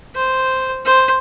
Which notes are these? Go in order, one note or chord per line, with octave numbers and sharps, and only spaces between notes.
C5
C5